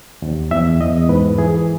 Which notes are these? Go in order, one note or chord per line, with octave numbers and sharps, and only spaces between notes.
D#2
E2 E5
E2 D#5
G#2 B4
E3 G#4